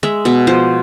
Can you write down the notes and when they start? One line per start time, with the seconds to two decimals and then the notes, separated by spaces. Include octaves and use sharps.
0.03 G#3 E5
0.25 B2 E5
0.47 F3 C5